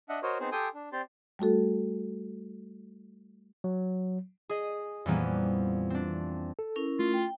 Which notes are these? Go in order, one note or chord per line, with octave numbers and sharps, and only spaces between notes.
D4 D#5 E5 F#5
F#4 A#4 C5 C#5 D#5
B3 C4 D#4 G#4 C5
G4 A4 G5 G#5 C6 D#6
D4
C4 G4 D5 C6
G3 A3 F#4 A4
F#3
G#4 D#5
F2 A#2 E3 G3 A#3 B3
C4 D4
A4
C#4 E4 A#4
A3 F4
G5